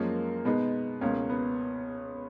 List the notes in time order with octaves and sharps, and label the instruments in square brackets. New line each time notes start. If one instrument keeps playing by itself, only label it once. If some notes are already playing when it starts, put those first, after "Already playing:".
Already playing: [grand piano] F#2 F3 G#3 C#4 [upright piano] A#3
[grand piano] B2 G#3 D#4 [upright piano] B3
[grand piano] C#2 B2 A#3 [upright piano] C#4
[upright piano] B3